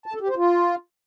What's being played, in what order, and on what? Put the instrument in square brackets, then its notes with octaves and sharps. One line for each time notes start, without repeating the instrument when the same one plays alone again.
[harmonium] A5
A4
G4
C5
F4